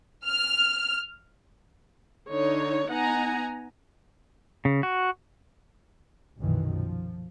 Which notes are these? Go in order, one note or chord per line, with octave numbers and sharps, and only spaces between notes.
F6
D3 D#4 C#5
B3 D#4 F#5 G#5 A#5
C#3
F#4
B1 F#2 A#2 D#3 E3
F3